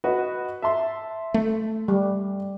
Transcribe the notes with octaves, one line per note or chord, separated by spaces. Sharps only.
F#4 B4 D#5
E5 A5 C6
A3
G3